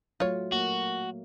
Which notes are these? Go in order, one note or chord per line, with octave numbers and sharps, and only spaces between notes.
F#3 A3 F4 C#5
A#3 F#4